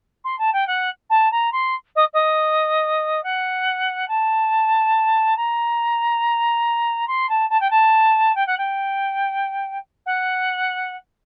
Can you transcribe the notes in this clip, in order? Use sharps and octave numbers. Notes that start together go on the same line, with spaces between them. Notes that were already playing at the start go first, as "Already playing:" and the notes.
C6
A5
G5
F#5
A5
A#5
C6
D#5
D#5
F#5
A5
A#5
C6
A5
A5
G5
A5
G5
F#5
G5
F#5